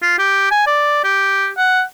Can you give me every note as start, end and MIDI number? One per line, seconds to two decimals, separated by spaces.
0.02 0.17 65
0.19 0.51 67
0.51 0.62 80
0.67 1.03 74
1.04 1.49 67
1.58 1.82 78